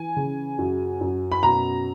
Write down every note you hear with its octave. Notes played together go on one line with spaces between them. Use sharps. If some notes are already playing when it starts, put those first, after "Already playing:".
Already playing: E3 G#5
C#3
F#2
F#2
B5
B2 A#5